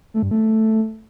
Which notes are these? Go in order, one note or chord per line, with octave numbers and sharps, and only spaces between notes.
A3
G2
A3